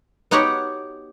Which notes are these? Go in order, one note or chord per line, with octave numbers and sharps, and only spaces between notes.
B3 D#4 F#4 G4 C#5 F#5